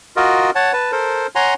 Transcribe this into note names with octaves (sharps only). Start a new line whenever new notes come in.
F4 F#4 A#4 D#5
C#5 F#5 A5
B4 A5
A4 A#4 C5
C#5 F#5 G#5 A#5 C6